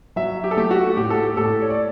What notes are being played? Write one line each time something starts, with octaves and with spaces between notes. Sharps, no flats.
F#3 E5
G4
A4
A3 G4
F#4
A2 G4
A4
G4
A2 A4
C#5
D5